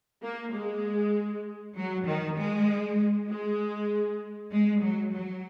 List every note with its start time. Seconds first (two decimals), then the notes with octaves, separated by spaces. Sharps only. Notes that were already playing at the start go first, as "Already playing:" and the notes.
0.23 A#3
0.53 G#3
1.76 F#3
2.06 D#3
2.38 G#3
3.29 G#3
4.52 G#3
4.82 F#3
5.13 F#3